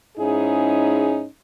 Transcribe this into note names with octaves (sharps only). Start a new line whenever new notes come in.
G#2 C#4 D#4 E4 G#4